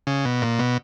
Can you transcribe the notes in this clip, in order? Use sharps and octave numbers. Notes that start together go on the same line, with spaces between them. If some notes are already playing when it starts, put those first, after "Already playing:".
C#3
B2
A#2
B2